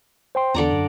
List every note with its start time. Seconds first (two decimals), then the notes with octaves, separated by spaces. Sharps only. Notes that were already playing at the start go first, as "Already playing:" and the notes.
0.35 C5 G5 C6
0.55 E2 D3 D5 A#5
0.73 F#2